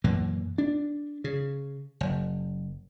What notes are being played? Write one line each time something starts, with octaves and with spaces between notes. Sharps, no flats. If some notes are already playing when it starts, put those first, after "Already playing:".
F#2 A#2 E3 A#3
D4
C#3
F#1